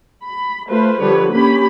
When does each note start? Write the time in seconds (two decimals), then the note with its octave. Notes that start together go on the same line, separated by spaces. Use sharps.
0.22 B5
0.68 A3 F4 B4 C5
1.01 D3 F3 G3 G4 B4 C#5
1.33 A#3 C#4 G4 B5